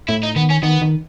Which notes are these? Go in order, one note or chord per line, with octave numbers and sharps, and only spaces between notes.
A2 E4
D#4
D#3 B3
C#4
D#3 B3
D#3